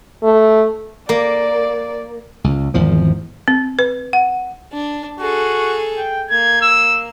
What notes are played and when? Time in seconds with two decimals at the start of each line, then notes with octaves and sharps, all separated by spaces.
0.23 A3
1.09 A#3 D5
2.44 C#2
2.74 G#1 E2 F3
3.48 C4
3.79 B4
4.13 F#5
4.73 D4
5.20 F#4 G#4 A4
5.98 G5
6.30 A#3 G#6
6.62 E6